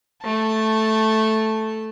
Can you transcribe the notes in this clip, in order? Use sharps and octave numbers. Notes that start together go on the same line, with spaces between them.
A3 A5